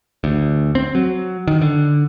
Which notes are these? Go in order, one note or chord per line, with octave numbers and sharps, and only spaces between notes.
D2
C4
F#3
D#3
D3